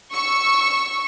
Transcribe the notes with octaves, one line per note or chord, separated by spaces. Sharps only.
C#6 E6